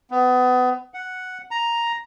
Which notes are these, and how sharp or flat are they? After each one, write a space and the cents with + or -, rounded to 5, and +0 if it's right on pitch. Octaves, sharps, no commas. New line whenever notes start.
B3 +30
F#5 +0
A#5 +5